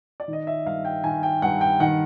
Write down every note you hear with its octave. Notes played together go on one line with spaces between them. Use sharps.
D5
D#3
D#5
E5
G2 F5
G5
D#3 G#5
G5
G2 F#5
G5
D#3 F#5